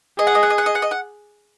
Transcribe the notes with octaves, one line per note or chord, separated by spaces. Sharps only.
G#4 D#5
F#5
D#5
F#5
D#5
F#5
D#5
F#5
D#5
F#5